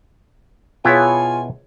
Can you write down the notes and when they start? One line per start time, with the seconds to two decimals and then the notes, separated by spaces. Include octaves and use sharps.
0.85 B2 B3 E4 F4 G#4 C#5 G#5